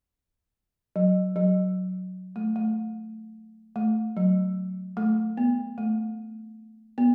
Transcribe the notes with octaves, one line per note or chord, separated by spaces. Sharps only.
F#3
F#3
A3
A3
A3
F#3
A3
B3
A3
B3